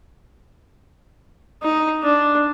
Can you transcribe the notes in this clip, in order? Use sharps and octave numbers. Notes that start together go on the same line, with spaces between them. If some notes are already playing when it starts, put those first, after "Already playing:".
D#4
D4